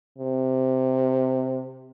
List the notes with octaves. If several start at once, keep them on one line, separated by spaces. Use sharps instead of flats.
C3